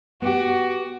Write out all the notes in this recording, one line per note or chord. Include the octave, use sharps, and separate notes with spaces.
B3 F#4 G4 D6